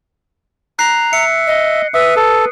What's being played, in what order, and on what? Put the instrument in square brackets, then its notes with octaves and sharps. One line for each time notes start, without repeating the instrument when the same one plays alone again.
[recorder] A#5 [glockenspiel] F#6 C7
[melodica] E5 [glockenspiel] C#7
[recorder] D#5
[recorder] B4 [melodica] E5 [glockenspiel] D#6
[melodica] A4